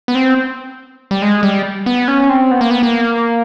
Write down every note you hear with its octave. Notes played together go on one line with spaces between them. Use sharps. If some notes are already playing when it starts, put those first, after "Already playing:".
B3
C4
G3
G#3
G3
B3
C#4
C4
B3
A#3
B3
A#3